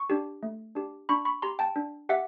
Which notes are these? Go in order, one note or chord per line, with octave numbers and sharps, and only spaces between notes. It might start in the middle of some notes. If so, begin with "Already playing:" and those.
Already playing: C#6
D4 G4
A3
D4 G4
D4 B5 C#6
B5 C#6
G4 A#5 C6
G5 A5
D4
G4 E5 F#5